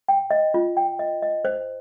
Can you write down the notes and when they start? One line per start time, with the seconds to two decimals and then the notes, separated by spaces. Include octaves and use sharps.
0.08 G5
0.31 D#5
0.54 F4
0.77 G5
0.99 D#5
1.22 D#5
1.45 C5